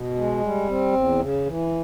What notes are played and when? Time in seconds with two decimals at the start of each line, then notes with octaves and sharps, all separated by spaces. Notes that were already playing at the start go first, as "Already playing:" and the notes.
Already playing: B2
0.15 G#3
0.41 G3
0.67 C4
0.93 E2
1.19 C#3
1.46 E3